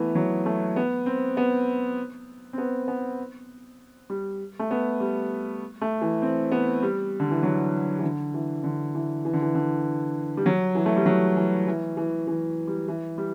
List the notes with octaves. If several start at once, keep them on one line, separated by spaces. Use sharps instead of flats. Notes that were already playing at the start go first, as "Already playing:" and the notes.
Already playing: E3 A3 B3
F#3
A3
B3
C4
B3
C4
B3
B3
G3
A3
B3
G3
A3
E3
C4
B3
G3
D3
E3
F#3
E3
D3
E3
D3
E3
E3
D3
E3
D3
G3
F#3
E3
A3
G3
F#3
E3
E3
E3
E3
G3
E3
G3